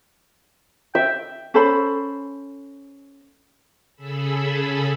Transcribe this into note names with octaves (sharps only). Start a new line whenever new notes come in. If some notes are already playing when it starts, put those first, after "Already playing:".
E5 G5
C#4 A4 C5 B5
C#3 G#4 A4 B5 E6